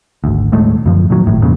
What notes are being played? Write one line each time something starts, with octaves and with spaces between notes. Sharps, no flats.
G#1 D2
D#1 A2 G#3 A3
F#2 D3 F3
A#2 D#3 F#3
G#1 A2
F2 A#2 C#3